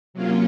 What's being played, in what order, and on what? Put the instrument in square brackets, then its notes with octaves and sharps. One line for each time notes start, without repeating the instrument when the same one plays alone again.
[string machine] C3 F#3 A#3 C#4 F4